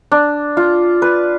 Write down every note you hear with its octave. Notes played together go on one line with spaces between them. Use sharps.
D4
F4
B4